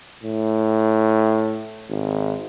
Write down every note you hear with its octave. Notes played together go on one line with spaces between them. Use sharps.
A2
G#1